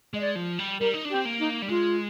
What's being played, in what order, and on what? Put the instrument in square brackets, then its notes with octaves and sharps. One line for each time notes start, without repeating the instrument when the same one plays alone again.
[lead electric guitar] G#3 [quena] D#5
[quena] D5
[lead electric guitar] F3
G3
[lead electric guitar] G3 [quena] A#4
[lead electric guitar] D#4
D4
[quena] G4
[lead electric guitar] C4
A#3
[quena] D#4
[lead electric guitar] G3
[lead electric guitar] G#3 [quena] F4